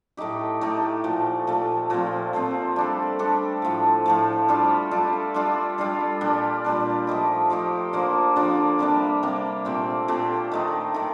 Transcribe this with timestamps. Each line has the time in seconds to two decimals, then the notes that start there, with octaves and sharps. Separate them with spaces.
0.17 A2 A3 D#4 G4
0.61 A2 A3 D#4 G4
1.04 A#2 F3 A3
1.47 A#2 F3 A3
1.90 A#2 F3 A3 C4
2.33 A#2 F3 A3 C4
2.76 G3 D4 A4
3.19 G3 D4 A4
3.62 A2 F3 A3
4.06 A2 F3 A3
4.48 G3 D4 F4 A4
4.91 G3 D4 F4 A4
5.34 G3 D4 F4 A4
5.78 G3 D4 F4 A4
6.21 A#2 G3 D4
6.64 A#2 G3 D4
7.07 F3 A3 D#4 G4
7.50 F3 A3 D#4 G4
7.93 D3 F3 A#3 D4
8.36 D3 F3 A#3 D4
8.79 C3 G3 A#3 D4
9.23 C3 G3 A#3 D4
9.65 A#2 A3 C4 G4
10.08 A#2 A3 C4 G4
10.52 D#3 A3 D#4
10.94 D#3 A3